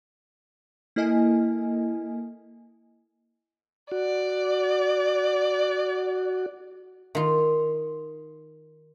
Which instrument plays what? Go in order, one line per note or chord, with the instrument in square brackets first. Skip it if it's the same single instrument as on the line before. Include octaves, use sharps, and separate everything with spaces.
[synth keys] A#3 E4 A4 D#5 G#5
[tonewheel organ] F#4 [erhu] D5
[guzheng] D#3 F4